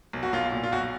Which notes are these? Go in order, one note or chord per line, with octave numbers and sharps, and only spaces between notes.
B1
F#4
B1 F4
A#2
F4
B1 F#4